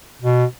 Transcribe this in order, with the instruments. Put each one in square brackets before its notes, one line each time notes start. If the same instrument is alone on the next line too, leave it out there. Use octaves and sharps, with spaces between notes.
[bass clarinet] B2